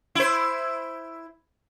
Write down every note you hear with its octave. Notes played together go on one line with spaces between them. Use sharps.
E4 C5